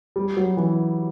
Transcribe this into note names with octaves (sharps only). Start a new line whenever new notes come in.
G3
F#3
E3